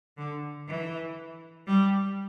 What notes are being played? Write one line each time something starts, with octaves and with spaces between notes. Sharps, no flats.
D3
E3
G3